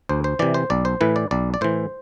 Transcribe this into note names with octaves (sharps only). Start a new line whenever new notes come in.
D2 C5
C5
C3 E3 D5
C5
B1 D5
C5
A2 E3 B4
D5
B1 D5
D5
A2 E3 C5